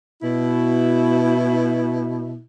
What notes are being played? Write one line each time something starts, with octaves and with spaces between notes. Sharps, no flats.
B2 E4